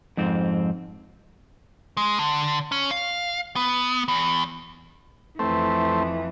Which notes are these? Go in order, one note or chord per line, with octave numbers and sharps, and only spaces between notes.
F2 G#2 C4
G#3
D3
C#4
F5
B3
E2
F2 E3 A3 C4